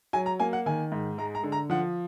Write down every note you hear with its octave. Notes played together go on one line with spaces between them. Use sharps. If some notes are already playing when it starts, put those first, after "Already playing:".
F#3 G#5
A#5
A#3 G#5
F#5
D#3 G#5
G#2
G#3 A#5
A#5
D3
A#5
F3 F#5